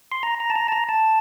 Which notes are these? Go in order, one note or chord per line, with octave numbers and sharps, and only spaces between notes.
C6
A#5
A#5
A5
A#5
A5
A#5
A5